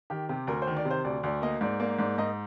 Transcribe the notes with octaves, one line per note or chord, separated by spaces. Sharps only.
D#3 G4
C3 G4
D2 A#4
C5
D#3
D5
C3
C5
D2 D5
D2 D5
A#3 D#5
G#2 D5
A#3 D5
G#2 D5
G#2 D#5